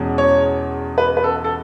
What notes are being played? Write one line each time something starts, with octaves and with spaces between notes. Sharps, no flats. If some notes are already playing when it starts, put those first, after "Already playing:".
Already playing: E2 B2 G#3 C#4
C#5
B4
B4
A4
A4